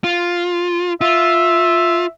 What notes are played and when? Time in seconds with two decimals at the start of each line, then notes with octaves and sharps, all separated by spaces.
0.04 F4
1.01 F4 E5